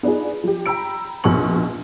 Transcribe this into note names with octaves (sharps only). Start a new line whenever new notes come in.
B3 D4 D#4 F4 G#4
F3 G4
G5 A#5 B5 E6 D7
F1 A#1 B2 C6 C#6 F#7